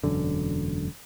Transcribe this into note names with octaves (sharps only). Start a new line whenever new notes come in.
E1 F#2 D3